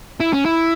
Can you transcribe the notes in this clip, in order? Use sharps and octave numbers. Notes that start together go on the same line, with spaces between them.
E4
C#4
E4